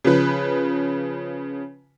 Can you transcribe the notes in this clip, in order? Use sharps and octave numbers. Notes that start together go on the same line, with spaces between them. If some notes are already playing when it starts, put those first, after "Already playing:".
C#3 F3 B4